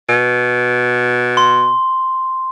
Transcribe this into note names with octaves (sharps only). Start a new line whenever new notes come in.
B2
C6